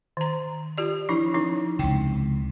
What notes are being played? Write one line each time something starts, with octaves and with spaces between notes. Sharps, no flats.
D#3 A#5
F4 G4 D5
F3 D4 E4
F3 C#4 D#4
C#2 C3 G5